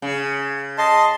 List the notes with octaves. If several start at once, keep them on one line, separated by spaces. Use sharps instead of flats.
C#3
D#5 A5 C6